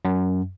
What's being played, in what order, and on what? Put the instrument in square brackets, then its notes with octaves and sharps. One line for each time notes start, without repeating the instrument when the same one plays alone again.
[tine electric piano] F#2